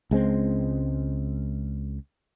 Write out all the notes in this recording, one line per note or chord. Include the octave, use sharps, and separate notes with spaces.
C#2 G#3 C4